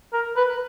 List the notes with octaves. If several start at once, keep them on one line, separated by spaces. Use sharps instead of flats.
A#4
B4